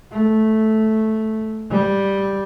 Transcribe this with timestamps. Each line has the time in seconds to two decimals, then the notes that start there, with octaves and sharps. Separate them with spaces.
0.12 A3
1.71 G3